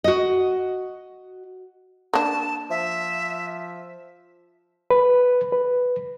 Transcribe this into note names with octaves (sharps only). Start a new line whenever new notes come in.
F#4 D#5
A#3 D4 A5
F3 E5
B4
B4